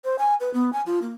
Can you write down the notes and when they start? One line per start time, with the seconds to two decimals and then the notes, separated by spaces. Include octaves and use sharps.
0.04 C5
0.19 G#5
0.40 B4
0.54 B3
0.73 G#5
0.86 F4
1.02 A#3